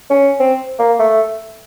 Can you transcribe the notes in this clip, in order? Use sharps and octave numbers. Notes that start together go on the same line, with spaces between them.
C#4
C4
A#3
A3